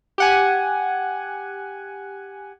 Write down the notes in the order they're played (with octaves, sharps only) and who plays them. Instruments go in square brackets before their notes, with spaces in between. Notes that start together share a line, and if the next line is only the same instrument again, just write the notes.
[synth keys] G4 F#5 G#5